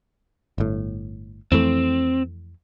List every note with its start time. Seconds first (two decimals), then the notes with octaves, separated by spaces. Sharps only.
0.58 G1 A2
1.52 F2 E3 A3 C4